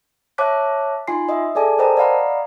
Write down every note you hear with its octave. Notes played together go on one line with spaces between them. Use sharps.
C#5 E5 A5 D6 F#6 B6
D#4 F4 G#5 C6 C7
D#5 E5
G#4 A4 D5 G#5 A5
A#4 C5 D#5 G5 A5 A#5
D5 D#5 F5 F#5 A#5 B5